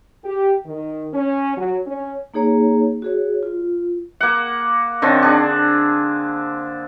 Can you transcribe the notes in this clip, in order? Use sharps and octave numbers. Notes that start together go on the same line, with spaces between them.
G4
D#3
C#4
F#3
C#4
A#3 D#4 G#4 C#5 A#5
F#4 G#4 C#5
F4
A#3 F#5
D3 D#3 C4 C#4
D4 G#4